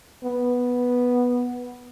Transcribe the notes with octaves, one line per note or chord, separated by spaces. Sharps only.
B3